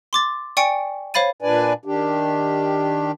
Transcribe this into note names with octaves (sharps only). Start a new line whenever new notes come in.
C6 D6 A6
D5 G5 G#5 C#6 C#7 D7
C5 C#5 F5 B5 A6 D#7
A#2 D4 B4 D5 G#5
D#3 D4 G4